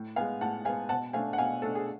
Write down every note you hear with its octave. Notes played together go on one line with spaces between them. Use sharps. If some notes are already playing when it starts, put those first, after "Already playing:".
Already playing: A2
G#3 B3 F5 G#5
A2 F#5 A5
G#3 B3 F5 G#5
B2 F#5 A5
A3 D4 F5 G#5
F#5
B2 F5 G#5
A3 D4 A4
G#4